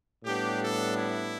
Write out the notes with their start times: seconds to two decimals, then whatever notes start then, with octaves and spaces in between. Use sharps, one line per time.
0.25 A2 G3 B3 D4 G4
0.62 A4
0.97 E4